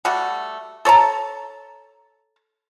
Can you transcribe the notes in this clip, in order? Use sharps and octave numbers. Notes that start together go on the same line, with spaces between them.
G3 A3 F#4 F#5
A4 C#5 A5 A#5